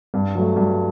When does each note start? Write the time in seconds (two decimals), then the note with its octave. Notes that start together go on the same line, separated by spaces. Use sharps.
0.14 G2
0.35 F#3 A3
0.56 G2